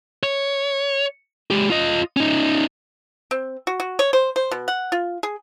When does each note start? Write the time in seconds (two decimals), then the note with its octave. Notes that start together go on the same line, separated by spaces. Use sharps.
0.23 C#5
1.50 G#3 G4
1.70 F4 D#5
2.17 C#4 D#4
3.31 C4
3.67 F#4
3.80 F#4
3.99 C#5
4.13 C5
4.36 C5
4.51 B2
4.68 F#5
4.92 F4
5.23 G#4